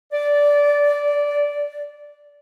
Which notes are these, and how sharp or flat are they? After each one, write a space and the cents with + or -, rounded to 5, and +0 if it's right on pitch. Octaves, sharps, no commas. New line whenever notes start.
D5 -15